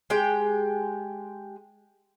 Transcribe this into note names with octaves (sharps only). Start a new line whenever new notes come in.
G#3 G4 G5